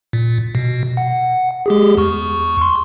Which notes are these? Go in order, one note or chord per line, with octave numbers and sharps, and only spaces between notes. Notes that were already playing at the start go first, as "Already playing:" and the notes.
A#2
B2
F#5
G#3 G4 G#4
E2 C#6
C6